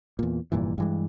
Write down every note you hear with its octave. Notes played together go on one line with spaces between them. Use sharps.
E2 A#2
F1 G2 A#2 E3
G2 E3 G#3